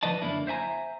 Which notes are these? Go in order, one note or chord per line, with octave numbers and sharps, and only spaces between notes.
F3 B4 D5 D#5 A5
F#2 D3 A#3 D4 E4
C5 E5 G#5 A#5